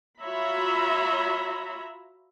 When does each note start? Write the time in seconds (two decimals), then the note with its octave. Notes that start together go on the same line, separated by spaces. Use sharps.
0.20 F4 F#4 C#5 E5 A#5 B5